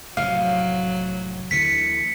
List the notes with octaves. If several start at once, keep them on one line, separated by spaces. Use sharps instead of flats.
F1 A2 C3 F#3 F5
D2 D3 E3 B6 C#7